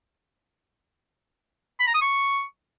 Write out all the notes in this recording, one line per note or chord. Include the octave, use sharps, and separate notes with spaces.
B5
A#5
D#6
C#6